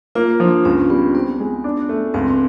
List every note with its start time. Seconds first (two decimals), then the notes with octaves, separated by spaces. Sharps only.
0.15 A#3 F4
0.40 F3 D4
0.65 C#2 C#4
0.89 G3 B3
1.14 B3 C4
1.40 G#3
1.64 D4
1.89 A3
2.14 C#2 C4